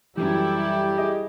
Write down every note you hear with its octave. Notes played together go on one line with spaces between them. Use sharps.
F#2 E3 G3 E4 G4 A4
G#4 D#5 E5